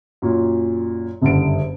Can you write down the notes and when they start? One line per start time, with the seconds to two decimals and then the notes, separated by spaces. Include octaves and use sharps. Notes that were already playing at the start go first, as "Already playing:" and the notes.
0.22 F#2 A#2
1.22 F#1 G2 D3 D7